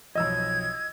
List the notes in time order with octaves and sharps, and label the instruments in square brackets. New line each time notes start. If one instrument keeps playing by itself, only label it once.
[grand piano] B1 F2 [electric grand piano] D#5 E6 [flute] G#6